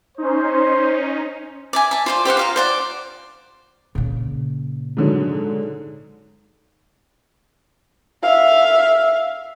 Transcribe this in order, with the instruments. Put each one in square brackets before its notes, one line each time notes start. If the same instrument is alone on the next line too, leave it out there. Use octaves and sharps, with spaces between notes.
[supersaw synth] C#4 D#4 [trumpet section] C5
[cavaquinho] D5 E5 G#5
E5 A5
F4 C5 D5
G4 C5 F5 F#5
F4 F5 A#5
C5 D5 F#5
[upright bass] A#2 C#3
[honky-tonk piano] G#2 D3 F#3
[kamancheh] E5 F5